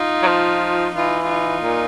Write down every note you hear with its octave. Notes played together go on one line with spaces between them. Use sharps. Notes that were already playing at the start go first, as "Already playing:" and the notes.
Already playing: D#4 F4
F#3
F3
E3 D#4 F4
D#4 F4
A#2